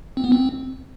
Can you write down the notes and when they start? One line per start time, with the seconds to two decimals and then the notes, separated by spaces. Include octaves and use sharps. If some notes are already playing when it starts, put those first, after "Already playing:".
0.17 C4
0.24 B3
0.32 C4